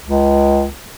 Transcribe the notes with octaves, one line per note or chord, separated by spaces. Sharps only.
C#2